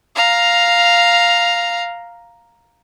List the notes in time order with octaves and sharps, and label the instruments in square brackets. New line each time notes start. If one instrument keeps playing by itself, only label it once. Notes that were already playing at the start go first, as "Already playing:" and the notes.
[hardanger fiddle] F5 A#5